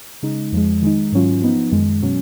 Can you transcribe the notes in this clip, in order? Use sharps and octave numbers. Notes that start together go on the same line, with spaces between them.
C#3 G#3 D#4
F2 F3 G#3
D#3 G#3 D#4
G#2 D#3 F#3 C#4 F4
F3 B3 D#4
F#2 D#3 G#3
B2 F#3 C#4